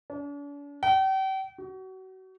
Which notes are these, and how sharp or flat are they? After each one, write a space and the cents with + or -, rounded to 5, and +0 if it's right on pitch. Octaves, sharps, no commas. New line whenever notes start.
D4 -45
G5 -40
F#4 +30